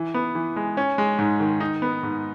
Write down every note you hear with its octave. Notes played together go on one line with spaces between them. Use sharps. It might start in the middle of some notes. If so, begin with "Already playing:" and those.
Already playing: E3
B3
E3
G#3
C#4
G#3
G#2
D#3
D#4
B3
G#2